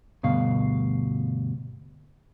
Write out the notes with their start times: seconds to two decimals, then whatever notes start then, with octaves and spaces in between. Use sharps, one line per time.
0.23 D2 G2 B2 F5